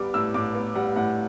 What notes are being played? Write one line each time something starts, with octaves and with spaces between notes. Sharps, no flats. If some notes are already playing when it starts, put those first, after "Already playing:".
Already playing: G3 B3 D6
A2 E6
A2 D6
B3
G3 F#5
A2 F#5